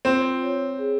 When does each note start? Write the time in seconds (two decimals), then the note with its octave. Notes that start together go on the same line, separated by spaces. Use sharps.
0.05 C4 F4
0.43 C#5
0.79 G#4